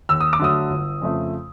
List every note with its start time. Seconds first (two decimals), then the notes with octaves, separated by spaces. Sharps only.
0.09 D#2 E6
0.20 D#6
0.33 D6
0.39 D3 F#3 A3 D#6
0.70 G1
1.02 F2 C#3 F3 A3